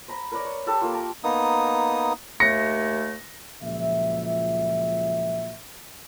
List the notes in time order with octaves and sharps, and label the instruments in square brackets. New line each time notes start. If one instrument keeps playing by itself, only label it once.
[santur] C5 A#5 B5
A#4 B4 C#5 D5
C#6
G4 A4 F#5 B5
A#3 F4
A5 A#5 D6
[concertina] A#3 B3 D#4 D#6
[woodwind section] D#2 A3 [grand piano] A#6 C#7
[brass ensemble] C#2 A#2 F3 F#3 E5